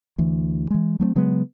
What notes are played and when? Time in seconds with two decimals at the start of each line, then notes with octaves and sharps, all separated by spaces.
0.18 D2 E3
0.70 E3 G#3
1.00 F#3 A3 B3 C4
1.15 C#3 F#3 G#3 B3